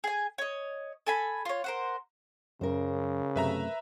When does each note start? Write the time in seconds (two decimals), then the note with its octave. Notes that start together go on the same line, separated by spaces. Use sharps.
0.04 G#4 G#5
0.38 C#5 D#5
1.07 A4 G#5 B5
1.45 F4 C#5
1.64 A#4 C5 F#5
2.61 F#2 C#3 A#4 C5
3.36 F#2 C3 A3 B4 E5 A#5